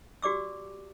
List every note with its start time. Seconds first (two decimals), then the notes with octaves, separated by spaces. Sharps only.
0.22 F#4 G4 D5 D6 E6